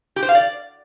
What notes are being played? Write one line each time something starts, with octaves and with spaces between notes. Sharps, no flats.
G4
C5
F5
D5